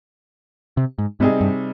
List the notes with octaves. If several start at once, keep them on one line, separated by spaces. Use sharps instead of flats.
C3
G#2
G#2 C3 G3 C4 D#4 G#4
G2